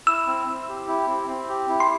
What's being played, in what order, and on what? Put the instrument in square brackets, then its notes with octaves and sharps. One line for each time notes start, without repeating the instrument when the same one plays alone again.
[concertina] E4 [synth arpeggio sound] E6
[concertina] C4
C4
G4
E4
C4
C4
G4
E4
[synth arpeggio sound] C6